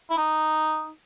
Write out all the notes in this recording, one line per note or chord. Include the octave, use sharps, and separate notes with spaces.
E4
D#4